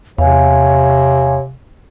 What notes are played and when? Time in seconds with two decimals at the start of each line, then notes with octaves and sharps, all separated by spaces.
0.18 E2 C3 C#5 F5 G#5